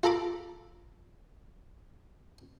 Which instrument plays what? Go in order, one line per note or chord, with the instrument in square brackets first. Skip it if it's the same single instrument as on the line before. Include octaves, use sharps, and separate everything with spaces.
[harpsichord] F4 A4 A#5 B5 D6